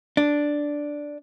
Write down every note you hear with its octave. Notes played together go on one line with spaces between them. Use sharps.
D4